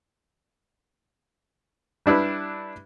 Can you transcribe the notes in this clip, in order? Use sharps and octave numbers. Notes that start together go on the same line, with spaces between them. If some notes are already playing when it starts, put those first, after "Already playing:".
G3 D4 E4 B4